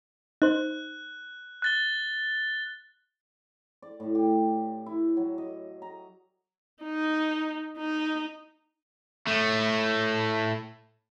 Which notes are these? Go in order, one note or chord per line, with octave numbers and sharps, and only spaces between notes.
D#4 C5 F#6
F#6 A6 G7
D5
A2
G4
E4
F#3
D#5
A#5
D#4
D#4
A2 A3